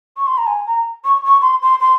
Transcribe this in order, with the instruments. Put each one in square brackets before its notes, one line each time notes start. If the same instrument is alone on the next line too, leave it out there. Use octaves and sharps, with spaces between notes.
[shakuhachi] C#6
C6
A#5
G#5
A#5
C#6
C#6
C6
C6
C6